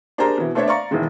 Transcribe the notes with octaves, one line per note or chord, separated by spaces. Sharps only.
D4 G4 G#4 A#4 C5 A#5
B2 E3
A3 B3 D4 C5 C#5 E5
D5 F5 A#5 C#6
E1 D#3 E3 G#3